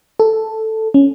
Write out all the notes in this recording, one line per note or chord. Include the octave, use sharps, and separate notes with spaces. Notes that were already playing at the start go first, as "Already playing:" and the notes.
A4
C#4